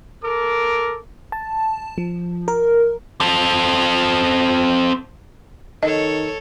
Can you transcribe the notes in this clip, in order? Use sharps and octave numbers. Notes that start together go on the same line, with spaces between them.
A4 A#4 D6
A5
F3
A#4
C4 A4
D#3 A4 C#5 D#5